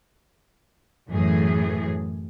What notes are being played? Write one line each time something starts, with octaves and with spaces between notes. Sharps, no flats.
F#2 A2 E3 G#4